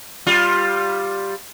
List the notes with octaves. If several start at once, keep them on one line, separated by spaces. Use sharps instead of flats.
G3 F4